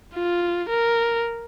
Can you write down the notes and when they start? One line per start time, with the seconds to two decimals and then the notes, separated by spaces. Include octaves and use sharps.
0.15 F4
0.69 A#4